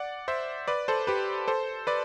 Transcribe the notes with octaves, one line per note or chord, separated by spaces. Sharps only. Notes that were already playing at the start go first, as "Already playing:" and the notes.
Already playing: D5 F#5
C5 E5
B4 D5
A4 C5
G4 B4
A4 C5
B4 D5